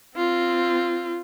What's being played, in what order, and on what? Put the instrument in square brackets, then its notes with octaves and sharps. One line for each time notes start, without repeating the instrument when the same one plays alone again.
[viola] C4 F4